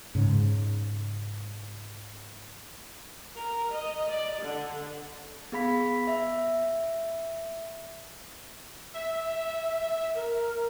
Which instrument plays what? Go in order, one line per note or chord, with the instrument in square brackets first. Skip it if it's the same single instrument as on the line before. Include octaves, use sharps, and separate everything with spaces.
[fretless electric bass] G#2 C#3
[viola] A#4
D#5
D5
D3
[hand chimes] B3 G#4 F5 B5 B6
E5
[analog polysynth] E5
[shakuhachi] A#4